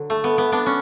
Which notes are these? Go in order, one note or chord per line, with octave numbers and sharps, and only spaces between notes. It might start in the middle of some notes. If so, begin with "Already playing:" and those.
Already playing: D3 F#3
A3
B3
B3
B3 D4
C#4